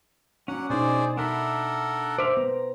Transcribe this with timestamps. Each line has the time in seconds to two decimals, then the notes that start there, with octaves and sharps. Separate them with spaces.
0.48 F#3 C#4 D4 F#5
0.70 B2 D#4 G#4 C5 D5
1.17 D4 A4 A#4 E5 F#5 B5
2.18 C5 D5 E5 F5
2.37 B3 A#5